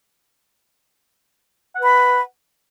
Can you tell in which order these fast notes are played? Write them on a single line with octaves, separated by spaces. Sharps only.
F#5 B4 B5